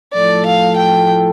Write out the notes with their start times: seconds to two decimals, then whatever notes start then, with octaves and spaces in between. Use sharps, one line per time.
0.14 A2 F3 A3 E4 A4 D5
0.46 F5
0.77 G5